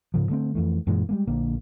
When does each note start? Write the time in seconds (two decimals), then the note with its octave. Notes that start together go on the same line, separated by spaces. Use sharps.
0.14 G#2 C#3 F3
0.29 D3 A3 C4
0.55 F2 E3 A3
0.87 F#2 A#2 E3 G#3
1.09 G3 G#3 A#3
1.27 A#1 D3 A#3